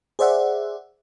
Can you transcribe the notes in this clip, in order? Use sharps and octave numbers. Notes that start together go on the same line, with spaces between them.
G#4 C5 D5 E5 F#5